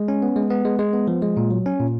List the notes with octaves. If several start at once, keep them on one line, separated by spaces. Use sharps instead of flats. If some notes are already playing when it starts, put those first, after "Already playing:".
Already playing: G#3
C#4
B3
G#3
B3
G#3
G#3
B3
F3
G#3
A#2
F#3
C#4
A#2